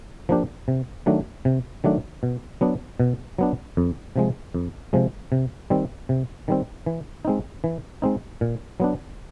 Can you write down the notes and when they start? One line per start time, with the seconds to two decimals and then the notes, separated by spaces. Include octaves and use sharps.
0.29 F3 A#3 D4 G4
0.68 C3
1.06 D#3 F#3 A3 D4
1.45 C3
1.84 D#3 F#3 A3 D4
2.23 B2
2.61 F#3 B3 D4
3.00 B2
3.38 F#3 B3 D4
3.77 F2
4.16 C3 F3 G#3
4.54 F2
4.93 C3 F3 G#3
5.32 C3
5.70 D#3 G3 C4
6.09 C3
6.48 D#3 G3 C4
6.86 E3
7.25 G#3 C4 D#4
7.64 E3
8.02 G#3 C4 D#4
8.41 A#2
8.80 F#3 B3 D4